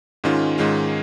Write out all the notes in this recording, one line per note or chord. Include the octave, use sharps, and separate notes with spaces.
G#2 D#3 G#3 C#4 F4
G#2 D#3 G#3 C#4 F4